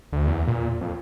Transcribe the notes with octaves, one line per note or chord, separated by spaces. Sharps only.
D2
E2
A#2
F2